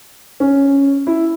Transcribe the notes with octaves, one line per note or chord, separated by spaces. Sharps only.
C#4
E4